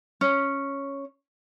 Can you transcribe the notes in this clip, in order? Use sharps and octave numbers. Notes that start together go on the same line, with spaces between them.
C#4